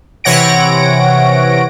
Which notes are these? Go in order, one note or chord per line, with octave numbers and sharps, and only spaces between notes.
C3 E3 C#5 F#5 A#6 D7